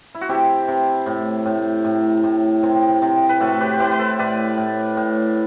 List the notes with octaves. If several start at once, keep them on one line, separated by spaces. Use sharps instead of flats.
E4
F#4
C3 E4 G4
C3
A2
A2
A2
A2
C3
C3
B4
A2 F#4 A4
G4 B4
C5
A2 G4 B4
B4
A4 C5
A2 B4 D5
A2
A2